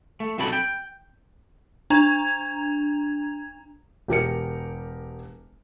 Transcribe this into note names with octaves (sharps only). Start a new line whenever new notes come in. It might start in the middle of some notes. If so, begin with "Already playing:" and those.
A3
B1 C4 F#4 A4 B5
G5
D4 A#5 G#6 F7
E1 G4 A#4 C#7